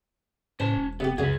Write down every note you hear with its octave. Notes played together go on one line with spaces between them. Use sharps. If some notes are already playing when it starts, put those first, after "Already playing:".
A2 C#4 C5 A5
E1
C3 B3 G4
C#2 F#2 C#3 F#4 G#4 B4